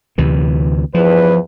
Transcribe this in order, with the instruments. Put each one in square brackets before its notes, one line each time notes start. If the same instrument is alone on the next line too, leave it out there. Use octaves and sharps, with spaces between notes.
[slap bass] D2 C3 E3
[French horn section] E2 G2 B4 [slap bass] F3